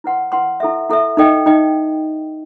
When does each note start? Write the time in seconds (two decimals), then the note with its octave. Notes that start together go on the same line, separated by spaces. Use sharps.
0.04 E4 B4 F#5 C6
0.32 E4 B4 F#5 C6
0.60 E4 A4 E5
0.89 E4 A4 E5
1.17 D#4 A4 D#5 G5
1.46 D#4 A4 D#5 G5